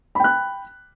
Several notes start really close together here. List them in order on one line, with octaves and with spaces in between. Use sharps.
B5 G5 F#6